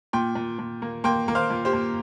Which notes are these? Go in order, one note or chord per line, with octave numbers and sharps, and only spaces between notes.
A#2 G5 C6
A#2
A#2
A#3
A#3 G5 C6
A#3
C5 F5
A#2
G4 C5
A#2